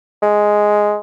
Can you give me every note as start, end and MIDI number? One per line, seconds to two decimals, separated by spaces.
0.22 0.98 56